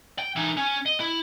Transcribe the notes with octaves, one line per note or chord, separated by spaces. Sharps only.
G5
E3 D#4
C#4
D#5
E4